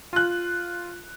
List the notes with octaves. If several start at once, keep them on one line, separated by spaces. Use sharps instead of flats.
F4 F#6